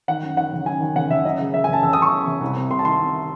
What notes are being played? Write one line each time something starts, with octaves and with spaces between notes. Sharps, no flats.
D#3 F#5
F#2
D#3 F#5
F#1
F#2 G#5
D#3
F#1 F#5
F#1 E5
F#2 D#5
C#3
F#1 E5
F#1 G#5
A5
F#1 E6
F#2 D#6
C#6
F#2
F#1
C2
C3
C2 C6
A5
D#3 C6
C3